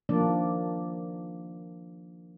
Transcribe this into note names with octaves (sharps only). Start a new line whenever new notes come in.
D#3 F3 A#3 D4 D5